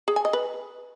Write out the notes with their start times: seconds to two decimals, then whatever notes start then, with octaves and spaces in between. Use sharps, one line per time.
0.08 G#4
0.16 G#5
0.25 D#5
0.33 B4